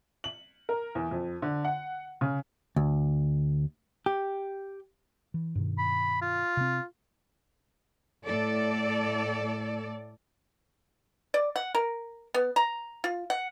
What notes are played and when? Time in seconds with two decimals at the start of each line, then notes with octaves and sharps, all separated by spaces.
0.24 F#7
0.69 A#4
0.95 E2
1.11 F2
1.42 D3
1.65 F#5
2.21 C#3
2.76 D2
4.06 G4
5.34 E3
5.55 G2 B2 D#3
5.78 B5
6.22 F4
6.57 C3 C4
8.26 A2 A4 D5
11.34 D5
11.56 F#5
11.75 A#4
12.34 B3
12.56 A#5
13.04 F4
13.30 F#5